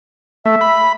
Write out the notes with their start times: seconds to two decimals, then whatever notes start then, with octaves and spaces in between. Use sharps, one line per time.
0.45 A3 E5
0.61 B5